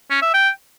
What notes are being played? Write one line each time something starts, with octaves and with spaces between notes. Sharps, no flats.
C#4
E5
G5